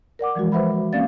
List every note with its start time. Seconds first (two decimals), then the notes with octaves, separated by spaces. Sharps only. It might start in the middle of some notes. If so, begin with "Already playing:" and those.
0.19 A#4 D5 F#5 D6
0.35 E3 F3 G#3 F#4
0.52 B4 C5 E5 F#5 B5
0.93 A#3 C4 C#4 D5 F5 A6